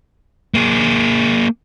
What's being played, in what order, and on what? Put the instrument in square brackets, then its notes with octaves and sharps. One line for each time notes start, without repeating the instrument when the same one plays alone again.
[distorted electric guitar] A#3 G#4